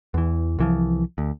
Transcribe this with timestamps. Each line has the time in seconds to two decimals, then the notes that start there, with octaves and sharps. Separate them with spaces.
0.14 E2 E3
0.59 C2 E3 F3
1.18 D2